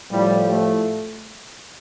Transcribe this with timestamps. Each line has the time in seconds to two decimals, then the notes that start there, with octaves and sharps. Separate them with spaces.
0.11 A2 F3 G3
0.50 A3